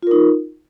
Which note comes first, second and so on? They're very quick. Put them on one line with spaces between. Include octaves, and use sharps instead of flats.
F4 A#4 D#4